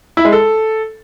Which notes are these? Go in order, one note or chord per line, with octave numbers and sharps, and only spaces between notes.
E4
G#3
A4